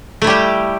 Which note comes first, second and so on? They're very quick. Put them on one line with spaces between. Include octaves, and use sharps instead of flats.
A3 E4 G3 G4